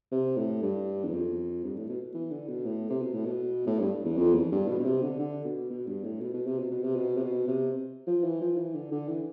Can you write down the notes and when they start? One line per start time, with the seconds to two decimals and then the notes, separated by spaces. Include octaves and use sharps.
0.11 C3
0.37 A2
0.62 G2
1.05 E2
1.13 F2
1.64 G2
1.77 A2
1.89 B2
2.15 E3
2.31 D3
2.48 B2
2.65 A2
2.90 C3
3.02 B2
3.14 A2
3.25 B2
3.67 A2
3.80 G2
4.05 E2
4.18 F2
4.34 E2
4.52 G2
4.68 B2
4.79 B2
4.85 C3
5.02 D3
5.19 D3
5.45 B2
5.70 B2
5.87 G2
6.04 A2
6.21 B2
6.34 B2
6.46 C3
6.59 B2
6.71 B2
6.84 C3
6.96 B2
7.17 C3
7.23 B2
7.48 C3
8.07 F3
8.24 E3
8.41 F3
8.58 E3
8.75 D3
8.92 D3
9.09 E3